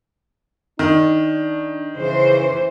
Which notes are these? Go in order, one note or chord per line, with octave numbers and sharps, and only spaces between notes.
D#3 D4
C#3 E3 C5